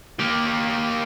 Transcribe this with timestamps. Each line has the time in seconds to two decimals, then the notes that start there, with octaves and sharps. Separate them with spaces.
0.19 A#3 G4